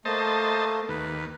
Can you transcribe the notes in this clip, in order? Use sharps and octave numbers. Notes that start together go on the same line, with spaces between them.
A3 A#3 C5 D#5 A5
D#2 B4